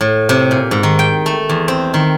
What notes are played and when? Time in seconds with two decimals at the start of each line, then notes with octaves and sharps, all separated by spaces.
0.01 A2
0.29 C3
0.51 A#2
0.71 G#2
0.83 D#3
0.99 G5
1.26 A3
1.49 E2
1.68 C4
1.94 D#3